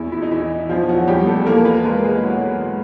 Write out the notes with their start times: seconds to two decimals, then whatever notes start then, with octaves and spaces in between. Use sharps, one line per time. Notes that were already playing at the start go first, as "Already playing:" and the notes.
Already playing: E2 E4
0.12 E4
0.22 D#4
0.31 E3 E4
0.69 E2 F3 F4
0.89 F#3 F#4
1.07 E2 G3 G4
1.26 A3 A4
1.46 E3 A#3 A#4
1.65 B3 B4
1.84 G#3 A#3 A#4
2.04 G#3 G#4
2.23 E3 F#3 F#4
2.61 G#3